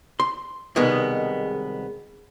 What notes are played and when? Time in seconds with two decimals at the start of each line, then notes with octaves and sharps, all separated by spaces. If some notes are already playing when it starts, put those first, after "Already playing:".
0.20 C6
0.76 C2 B2 D#3 G#3 B3